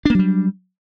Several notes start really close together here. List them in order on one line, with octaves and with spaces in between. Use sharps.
D4 A#3 F#3 G3